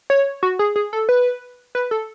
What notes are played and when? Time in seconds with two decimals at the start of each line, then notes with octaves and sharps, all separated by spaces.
0.10 C#5
0.43 F#4
0.59 G#4
0.76 G#4
0.93 A4
1.09 B4
1.75 B4
1.91 A4